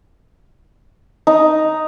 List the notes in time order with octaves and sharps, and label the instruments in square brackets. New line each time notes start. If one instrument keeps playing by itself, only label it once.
[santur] D#4